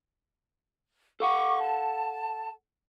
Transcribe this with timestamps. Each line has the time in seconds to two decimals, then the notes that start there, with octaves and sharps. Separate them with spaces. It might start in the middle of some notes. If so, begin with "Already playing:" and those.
1.20 A4 F5 F#5 C#6 D6
1.59 A5